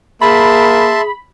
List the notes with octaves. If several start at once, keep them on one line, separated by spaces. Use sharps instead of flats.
A#3 G#4 E5 A5 B5 C6